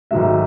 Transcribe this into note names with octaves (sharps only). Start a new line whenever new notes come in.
G#1 G#2 F#3 A3 E5